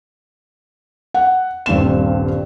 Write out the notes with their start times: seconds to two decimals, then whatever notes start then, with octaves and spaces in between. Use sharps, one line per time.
1.14 F#5
1.66 D#1 G2 C4 E7